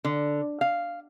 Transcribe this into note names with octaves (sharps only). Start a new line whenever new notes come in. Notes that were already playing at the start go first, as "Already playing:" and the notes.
D3
F5